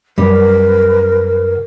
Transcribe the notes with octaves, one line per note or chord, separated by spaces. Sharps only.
F#2 G3 A#4 B4